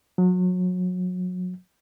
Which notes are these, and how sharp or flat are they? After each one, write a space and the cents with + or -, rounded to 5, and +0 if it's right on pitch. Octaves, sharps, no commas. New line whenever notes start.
F#3 -30